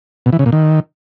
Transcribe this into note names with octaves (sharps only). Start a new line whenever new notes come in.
B2
E3
C#3
A#2
D#3